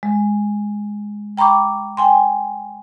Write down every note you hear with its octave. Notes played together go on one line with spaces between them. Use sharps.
G#3
G5 A#5 B5 C#6 D6
G5 G#5 C6